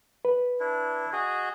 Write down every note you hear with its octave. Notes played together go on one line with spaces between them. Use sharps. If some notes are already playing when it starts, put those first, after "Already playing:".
B4
D4 E4
F#4 G#4 D#5